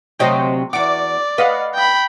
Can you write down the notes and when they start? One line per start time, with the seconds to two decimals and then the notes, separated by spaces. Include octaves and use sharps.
0.19 D2 C3 F#3 C5 D#5 G5
0.73 E2 F#4 D5 D6
1.38 B4 D#5 F5 F#5
1.75 G5 B5